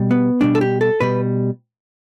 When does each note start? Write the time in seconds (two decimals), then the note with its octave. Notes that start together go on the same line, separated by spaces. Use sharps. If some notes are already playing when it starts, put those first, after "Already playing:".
Already playing: B2 G3
0.11 B3
0.41 B2 G3 D4
0.55 A4
0.61 G4
0.81 A4
1.01 B2 G3 B4